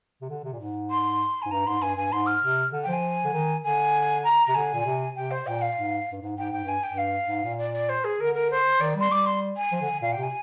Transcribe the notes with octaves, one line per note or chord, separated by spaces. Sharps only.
C3
D3
C3
A#2
G#2
C6
G#2 G#5
G2 A#5
G#2 C6
G2 G#5
G2 G#5
G#2 C6
F6
C3
D3
G5
F3
G#5
D3
D#3
D3 G#5
A#5
C3 A#5
D3 G#5
A#2
C3
C3 G5
C5
A#2 G5
F5
G#2
G2
G#2
G#2 G5
G#2 G5
G2 G#5
G2 G5
F5
G#2
A#2
D5
D5
C5
G#4
D3 A#4
A#4
C5
D#3 D5
G3 C6
G3 D6
C6
G#5
F3
D3
A#2 F5
G5
C3
G#5